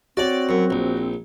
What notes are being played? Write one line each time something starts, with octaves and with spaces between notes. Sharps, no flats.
C4 F#4 C#5 D5
F#2
A#1